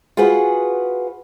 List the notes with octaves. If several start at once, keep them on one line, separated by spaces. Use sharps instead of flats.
F4 F#4 G#4 B4 F#5